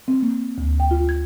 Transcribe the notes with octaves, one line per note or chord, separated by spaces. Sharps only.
C4
A#3
D2
G5
F4
G#6